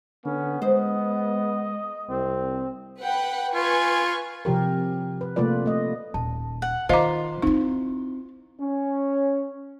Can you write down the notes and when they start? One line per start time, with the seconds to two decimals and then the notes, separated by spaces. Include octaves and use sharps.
0.25 D3 B3 C#4
0.62 G#3 C5 D#5
2.10 C2 C4
3.02 B4 F#5 G5
3.54 F4 B4 G#5 C#6
4.45 C3 F3 G4 A#4
5.21 B4
5.36 C3 A3 A#3 F4 B4 D5
5.66 A3 D#5
6.14 D#1 A5
6.62 F#5
6.89 D#3 F4 C5 D#5 F5 A#5 D6
7.42 C4 D#4 E4
8.61 C#4